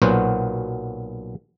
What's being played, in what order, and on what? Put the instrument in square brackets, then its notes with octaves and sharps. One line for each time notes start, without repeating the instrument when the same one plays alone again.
[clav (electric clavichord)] B1 A#2 F#3 B3 F#4 C5